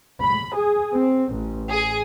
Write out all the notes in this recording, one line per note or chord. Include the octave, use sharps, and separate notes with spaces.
B5
G#4
C4
A1
G#4